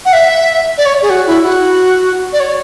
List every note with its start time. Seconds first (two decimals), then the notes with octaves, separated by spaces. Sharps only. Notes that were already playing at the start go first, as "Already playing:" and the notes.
0.05 F#5
0.13 E5
0.78 D5
0.86 C#5
1.02 G#4
1.10 F#4
1.27 E4
1.43 F#4
2.33 D5
2.40 C#5